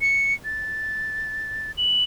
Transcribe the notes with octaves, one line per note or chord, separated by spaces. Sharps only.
C#7
A6
F#7